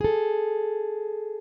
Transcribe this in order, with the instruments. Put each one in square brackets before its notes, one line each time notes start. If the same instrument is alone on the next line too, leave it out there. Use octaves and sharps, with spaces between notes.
[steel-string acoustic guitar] G#4 A4